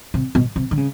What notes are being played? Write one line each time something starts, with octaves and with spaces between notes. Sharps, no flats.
C3
B2
C3
D3
C#3